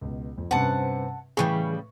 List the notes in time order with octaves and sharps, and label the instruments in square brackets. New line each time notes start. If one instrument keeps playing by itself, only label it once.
[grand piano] C#2 B2
F2
[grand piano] G2 C3 C#4 [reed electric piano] B4 C5 [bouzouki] F#5 A5
[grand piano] A2 B4 C#6 [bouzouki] C#3 F#3 G3 [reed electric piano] E3 G#4